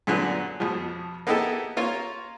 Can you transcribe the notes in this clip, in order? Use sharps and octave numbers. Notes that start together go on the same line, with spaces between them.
F#2 A#2 D3 B3 F#6
F2 B2 F3
A#3 B3 D#4 E4 G4 A4
A#3 C#4 F4 A#4 C#5